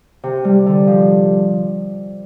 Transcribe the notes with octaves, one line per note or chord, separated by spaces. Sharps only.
C3
G3
D3
F3